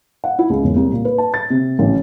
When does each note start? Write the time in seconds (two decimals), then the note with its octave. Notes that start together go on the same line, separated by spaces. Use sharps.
0.24 F#5
0.39 E4
0.50 C#2
0.64 E1
0.76 C2
0.92 A#2
1.05 B4
1.18 A5
1.34 A6
1.50 C3
1.79 A1